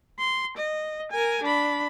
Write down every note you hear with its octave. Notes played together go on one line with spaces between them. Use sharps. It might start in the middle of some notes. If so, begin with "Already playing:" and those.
C6
D#5
A#4 G#5
D4 B5